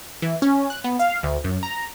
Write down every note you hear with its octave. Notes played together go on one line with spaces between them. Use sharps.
E3
C#4
F#6
B3
F5
D2
F#2
A#5